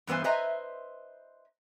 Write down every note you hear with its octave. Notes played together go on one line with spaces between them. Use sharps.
G2 E3 B3 C5 G#5
B4 C5 D#5 E5 G#5 A#5